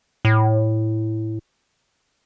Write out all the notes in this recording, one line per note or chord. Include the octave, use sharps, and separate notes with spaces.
A2